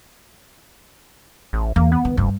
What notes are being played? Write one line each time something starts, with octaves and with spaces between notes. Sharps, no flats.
A1
E2 A#3
B3
D#3
F1 G2